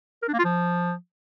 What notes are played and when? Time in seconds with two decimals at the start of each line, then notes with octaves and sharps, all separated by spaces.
0.23 A#4
0.28 D4
0.34 A#3
0.39 F4
0.45 F3